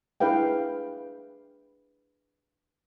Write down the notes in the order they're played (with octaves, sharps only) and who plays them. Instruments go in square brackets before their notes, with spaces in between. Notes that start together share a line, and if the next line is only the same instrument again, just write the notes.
[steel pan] D4 E4 G#4 B4 F5 G5